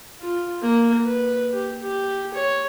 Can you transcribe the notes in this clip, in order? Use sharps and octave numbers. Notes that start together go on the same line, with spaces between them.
F4
A#3
B4
G4
G4
C#5